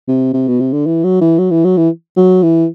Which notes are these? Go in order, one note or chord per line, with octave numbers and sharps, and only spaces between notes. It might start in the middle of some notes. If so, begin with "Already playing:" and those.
C3
C3
B2
C3
D3
E3
F#3
E3
F#3
E3
F#3
E3
F#3
E3